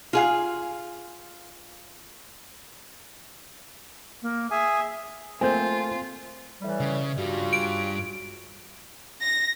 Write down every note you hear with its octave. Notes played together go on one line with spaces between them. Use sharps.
F4 G#4 F5
A#3
G#4 E5 G#5
A3 A#3 C4 F4 C5 G#5 G6
A2 E3 G3
C#3
G2 C#3 G3 F4 F#4
D7
A#6